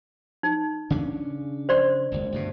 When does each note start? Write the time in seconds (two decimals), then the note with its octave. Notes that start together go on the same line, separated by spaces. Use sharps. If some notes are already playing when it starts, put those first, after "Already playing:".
0.43 D#4
0.90 C#3 C#4 D4
1.69 C5 D5 C6
2.12 F#1 C#2
2.32 D2 G2 B2